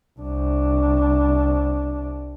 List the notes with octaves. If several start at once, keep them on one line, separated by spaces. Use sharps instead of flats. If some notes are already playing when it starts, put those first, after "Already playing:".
C2 D4